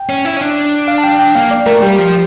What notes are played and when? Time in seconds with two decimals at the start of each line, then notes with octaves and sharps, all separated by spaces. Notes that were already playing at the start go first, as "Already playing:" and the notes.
Already playing: G5
0.09 C#4
0.25 E4
0.37 C#4
0.41 D4
0.88 F5
0.98 A5
1.04 G5
1.19 G5
1.35 A#3 F5
1.51 D5
1.66 A3 A#4
1.82 G3 G4
1.98 F3